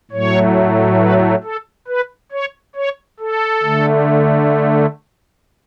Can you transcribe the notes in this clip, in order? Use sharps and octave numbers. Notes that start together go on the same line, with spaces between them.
A2 F#3 A3 C#5
B4
A4
B4
C#5
C#5
A4
D3 A3